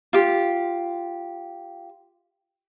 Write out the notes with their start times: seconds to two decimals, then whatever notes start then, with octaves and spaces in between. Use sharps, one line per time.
0.13 F4 G4